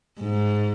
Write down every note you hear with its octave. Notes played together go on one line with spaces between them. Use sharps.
G#2